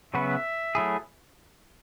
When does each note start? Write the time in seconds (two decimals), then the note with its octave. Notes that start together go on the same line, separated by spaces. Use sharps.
0.13 C#3 F#3 B3 F#4 B4 E5
0.75 F#3 A3 E4 G#4